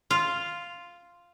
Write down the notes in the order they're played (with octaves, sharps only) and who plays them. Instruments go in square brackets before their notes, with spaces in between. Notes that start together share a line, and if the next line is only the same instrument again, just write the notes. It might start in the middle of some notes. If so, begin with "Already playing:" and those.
[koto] F4